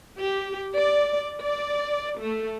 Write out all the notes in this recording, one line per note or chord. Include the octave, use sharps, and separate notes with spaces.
G4
D5
D5
A3